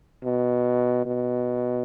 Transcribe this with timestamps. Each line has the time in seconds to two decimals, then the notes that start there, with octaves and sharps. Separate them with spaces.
0.24 B2
1.05 B2